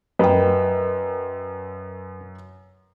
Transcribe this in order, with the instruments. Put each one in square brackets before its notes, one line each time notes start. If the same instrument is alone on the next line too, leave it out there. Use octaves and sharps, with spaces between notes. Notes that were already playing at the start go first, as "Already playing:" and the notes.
[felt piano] F#2 G5 [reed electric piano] A#4 B4 D#5